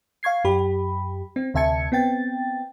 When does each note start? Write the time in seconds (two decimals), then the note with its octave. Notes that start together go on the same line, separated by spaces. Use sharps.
0.23 F5 C#6 G#6 C7
0.44 F#2 G4 B5
1.36 C4
1.54 D2 C3 E5 A5 G#6 C#7
1.92 B3 C4 G5 A6